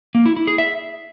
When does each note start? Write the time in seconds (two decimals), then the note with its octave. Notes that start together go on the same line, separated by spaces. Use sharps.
0.15 A#3
0.26 E4
0.37 E4
0.47 G#4
0.58 E5